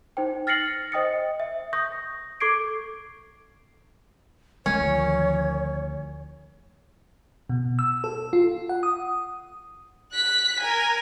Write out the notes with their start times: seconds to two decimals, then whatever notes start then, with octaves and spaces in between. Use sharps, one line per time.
0.17 D#4 C5 G5
0.47 F6 A6 A#6 C7 C#7 F#7
0.92 C5 D#5 G5 D#6 A6 C#7
1.40 E5
1.73 C#6 D#6 G6 A#6
2.40 A4 C#6 D6 G#6 C7 D7
4.66 D2 D#3 F3 C#4 C#5
7.50 B2
7.79 E6
8.04 A4
8.33 F4
8.69 F#5
8.83 D#6
10.12 F#6 B6
10.60 A#4 G#5